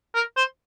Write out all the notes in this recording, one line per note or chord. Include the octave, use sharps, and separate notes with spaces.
A#4
C5